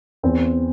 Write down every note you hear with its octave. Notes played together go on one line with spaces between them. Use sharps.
E2 C4